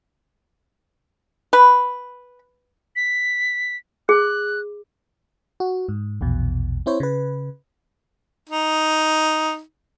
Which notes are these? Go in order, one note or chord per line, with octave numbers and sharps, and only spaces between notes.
B4
B6
G#4 F#6
F#4
G#2
A#1 E2 B2
C4 E4 C5 C#5
C#3 B4
D#4